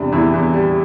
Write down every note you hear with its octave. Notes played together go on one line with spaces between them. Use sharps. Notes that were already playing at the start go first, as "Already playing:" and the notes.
Already playing: E2 C3 G3 D4
E2 E4
E2
G3